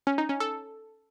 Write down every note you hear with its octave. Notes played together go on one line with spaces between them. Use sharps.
C#4
D#4
C#4
A4